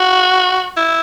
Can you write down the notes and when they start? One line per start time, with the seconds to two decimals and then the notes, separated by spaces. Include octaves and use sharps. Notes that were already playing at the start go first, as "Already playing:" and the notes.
Already playing: F#4
0.77 E4